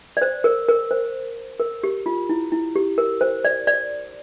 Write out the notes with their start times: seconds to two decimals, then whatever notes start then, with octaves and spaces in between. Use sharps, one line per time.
0.17 D5
0.22 C5
0.44 A#4
0.68 A#4
0.91 C5
1.60 A#4
1.84 G4
2.06 F4
2.30 E4
2.52 E4
2.76 G4
2.98 A#4
3.21 C5
3.45 D5
3.67 D5